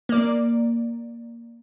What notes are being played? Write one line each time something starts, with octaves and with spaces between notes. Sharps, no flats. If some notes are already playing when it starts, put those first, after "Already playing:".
A#3 D5